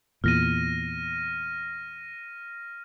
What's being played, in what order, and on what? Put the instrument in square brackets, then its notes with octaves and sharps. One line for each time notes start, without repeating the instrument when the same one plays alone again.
[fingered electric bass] E2 A#2 [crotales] F6 A#6 D#7